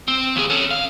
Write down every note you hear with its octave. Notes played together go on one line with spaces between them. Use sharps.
C4
D#2 G#4
C#4 A4
F5